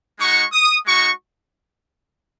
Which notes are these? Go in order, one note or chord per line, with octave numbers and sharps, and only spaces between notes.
G#3 D#4 F#4 C#6
D#6
G#3 D#4 F#4 C#6